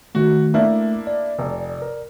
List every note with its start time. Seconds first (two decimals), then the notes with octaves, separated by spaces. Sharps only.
0.15 D#3 A3 F#4
0.54 A3 A#3 D4 E4
1.07 D5
1.39 F1
1.82 A#4